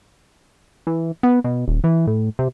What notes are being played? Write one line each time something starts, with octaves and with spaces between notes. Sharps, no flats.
E3
B3
B2
D#1
E3
A2
C3